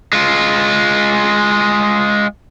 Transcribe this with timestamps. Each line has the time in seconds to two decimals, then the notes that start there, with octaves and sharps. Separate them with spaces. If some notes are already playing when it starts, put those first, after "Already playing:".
0.13 G#3 F4